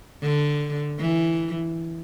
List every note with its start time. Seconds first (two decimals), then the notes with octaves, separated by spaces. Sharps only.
0.23 D3
0.99 E3